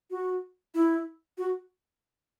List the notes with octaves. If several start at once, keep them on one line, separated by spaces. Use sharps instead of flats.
F#4
E4
F#4